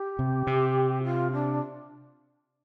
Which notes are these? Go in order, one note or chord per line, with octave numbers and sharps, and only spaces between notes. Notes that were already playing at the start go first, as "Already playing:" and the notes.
Already playing: G4
C3
C3
F4
D4